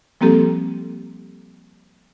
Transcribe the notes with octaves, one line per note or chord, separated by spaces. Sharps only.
F3 G3 A#3 C4 G4 A4